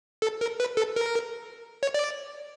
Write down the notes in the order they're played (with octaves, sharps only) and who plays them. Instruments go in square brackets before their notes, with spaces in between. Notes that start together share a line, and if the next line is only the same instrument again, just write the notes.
[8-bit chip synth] A4
A#4
B4
A4
A#4
C#5
D5